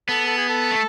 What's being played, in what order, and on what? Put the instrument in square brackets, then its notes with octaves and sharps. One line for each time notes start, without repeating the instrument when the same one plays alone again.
[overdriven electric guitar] B3 [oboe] A4
[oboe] A4
G#4
A4
[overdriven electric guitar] A3